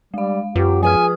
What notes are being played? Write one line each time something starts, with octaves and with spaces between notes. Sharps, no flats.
G3 G#3 F5
F#2 F4 G4
F3 G#4 B4 G#5 F6